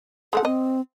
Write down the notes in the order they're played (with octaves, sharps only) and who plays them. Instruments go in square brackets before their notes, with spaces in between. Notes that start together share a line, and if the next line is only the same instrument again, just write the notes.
[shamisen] G#3 A3 F#5 [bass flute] A4
[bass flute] C4 [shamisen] D#5